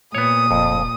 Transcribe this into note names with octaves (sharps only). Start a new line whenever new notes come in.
A#2 B3 C#5 D#6
D#1 F2